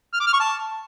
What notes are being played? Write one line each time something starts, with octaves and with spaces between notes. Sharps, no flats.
F6
D6
F6
C#6
A5